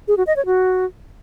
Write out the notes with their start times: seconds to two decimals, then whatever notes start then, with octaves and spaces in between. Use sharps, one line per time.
0.08 G#4
0.17 F#4
0.27 D#5
0.36 C#5
0.46 F#4